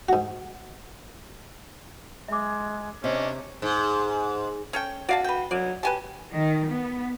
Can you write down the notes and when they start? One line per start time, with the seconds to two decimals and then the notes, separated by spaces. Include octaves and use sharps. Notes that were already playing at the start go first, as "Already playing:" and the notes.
0.09 G#2 F#4
2.28 G#3 E5 D6
3.04 C3 C#4 D4 D#5
3.62 G#2
4.73 C#4 A4 G5
5.09 F#4 D5 F5 A5
5.24 B4 G5
5.51 F#3 D5
5.83 G4 B4 G#5 A5
6.34 D#3
6.67 B3